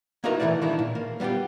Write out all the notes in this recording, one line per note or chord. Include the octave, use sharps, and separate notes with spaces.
A#3 D#4 E4 F#4 A#4 B4
A#2 E3 F3 A3 E4 D5
D#3 E3 G#3 D4 E4
A#2
A#3
G3 B3 D4 F4 G4